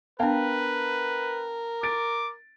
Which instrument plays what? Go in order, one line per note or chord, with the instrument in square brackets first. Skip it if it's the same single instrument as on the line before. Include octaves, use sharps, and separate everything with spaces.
[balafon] B3 D4 [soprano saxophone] A#4 [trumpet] B4 [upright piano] F5 G5 A5
[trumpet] D6 [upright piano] A6 D7